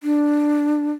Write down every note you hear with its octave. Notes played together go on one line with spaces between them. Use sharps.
D4